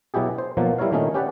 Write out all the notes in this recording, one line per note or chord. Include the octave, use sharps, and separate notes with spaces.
B2 F#3 E4 G4 G#4
C5
B2 F3 F#3 A#3
G3 E4 A#4 C#5 F5
A#2 D#3 A3 C#4 D#4
C#4 G4 B4 D5 F#5